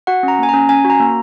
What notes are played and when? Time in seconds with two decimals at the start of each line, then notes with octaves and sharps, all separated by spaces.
0.07 F#4 F#5
0.23 C#4 A#5
0.39 A#3 G#5
0.49 C#4 A#5
0.69 C#4 G#5
0.85 F#4
0.90 A#5
1.00 A#3